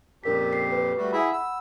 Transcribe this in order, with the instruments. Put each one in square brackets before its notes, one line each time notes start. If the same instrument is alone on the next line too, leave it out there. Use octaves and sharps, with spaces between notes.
[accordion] F2 A#2 G4 [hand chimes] C#4 A#4 B6
[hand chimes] C7
B4
[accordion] G3 A3 F#4
[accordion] E4 G#4 E5 [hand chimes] F#5 B5
[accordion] E6